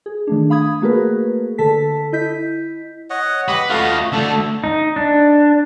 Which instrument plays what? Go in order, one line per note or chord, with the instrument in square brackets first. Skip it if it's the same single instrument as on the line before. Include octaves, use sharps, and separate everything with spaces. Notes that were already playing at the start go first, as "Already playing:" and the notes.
[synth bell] G#4
D#3 A3 D4
F5 B5 D#6 G#6
A3 A#3 F#4 G#4 A#4 B4
D3 A4 A5 B6
E4 D#5 G6 B6
[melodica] C#5 D#5 F#5
[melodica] G4 D#5 F#5 [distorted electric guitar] B4
[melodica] A3 F#4 F5 [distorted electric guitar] F4 D#5
[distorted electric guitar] D3 A3 [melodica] A4
[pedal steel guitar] D#4
D4